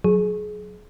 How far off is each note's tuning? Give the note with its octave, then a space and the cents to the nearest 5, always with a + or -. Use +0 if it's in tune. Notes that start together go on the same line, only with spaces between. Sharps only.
F#3 -15 G#4 +25